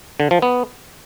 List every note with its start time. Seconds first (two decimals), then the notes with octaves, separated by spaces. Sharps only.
0.20 D3
0.31 F3
0.42 B3